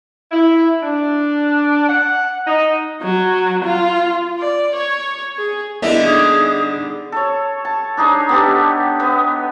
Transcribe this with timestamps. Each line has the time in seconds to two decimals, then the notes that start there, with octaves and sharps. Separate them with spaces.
0.32 E4
0.83 D4
1.89 F#5
2.47 D#4
3.02 F#3
3.65 F4
4.39 D5
4.76 C#5
5.38 G#4
5.82 D3 G3 A#3 B3 D4 E4 D#5 E5
6.03 D#4 G#4 D6 G#6
7.12 A4 C#5
7.65 A5
7.97 D4 D#4 G#4 C#5
8.29 B3 G4 A4
9.00 B3